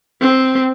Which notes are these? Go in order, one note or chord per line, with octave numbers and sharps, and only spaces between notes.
C4